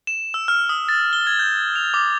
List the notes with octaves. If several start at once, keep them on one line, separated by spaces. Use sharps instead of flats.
E7
E6
F6
D#6
A6
G7
G#6
G6
F7
D6